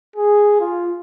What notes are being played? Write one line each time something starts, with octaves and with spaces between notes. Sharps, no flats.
G#4
F4